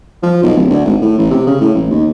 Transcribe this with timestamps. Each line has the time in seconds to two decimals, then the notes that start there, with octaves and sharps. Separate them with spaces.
0.23 F3
0.43 B1
0.57 D1
0.70 D2
0.85 G#1
1.01 A2
1.18 A1
1.31 C3
1.47 C#3
1.61 A2
1.75 A1
1.91 D#2